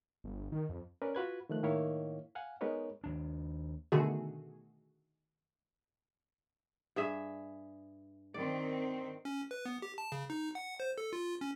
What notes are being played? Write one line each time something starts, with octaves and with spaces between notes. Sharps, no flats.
G1
D#3
F2
C#4 A#4 B4 D5
F4 F#4 B4 G#6
D#3 F3 A3 F#6
A2 D#3 A#3 E4 C#5 F5
F5 F#5 G#5
G#3 B3 D#4 A#4 B4 C#5
D#2 D4
B2 D3 D#3 A3 F#4 G#4
G2 G#4 E5
D#3 C4 D5
C#4
B4
B3
G4
A5
C#3
D#4
F#5
C5
A4
F4
C#4